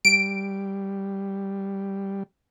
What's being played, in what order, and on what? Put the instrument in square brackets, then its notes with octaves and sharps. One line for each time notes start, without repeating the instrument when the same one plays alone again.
[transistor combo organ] G3 [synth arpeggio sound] D7